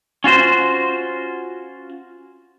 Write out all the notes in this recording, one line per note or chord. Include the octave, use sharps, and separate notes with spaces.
C#4 F4 F#4 C5